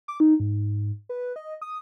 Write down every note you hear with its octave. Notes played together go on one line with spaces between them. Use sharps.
D6
D#4
G#2
B4
D#5
D#6